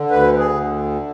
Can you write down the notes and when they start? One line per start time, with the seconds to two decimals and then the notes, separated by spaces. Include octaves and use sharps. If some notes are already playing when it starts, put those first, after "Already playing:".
Already playing: D3
0.11 D2 B4
0.39 G#4
0.53 D3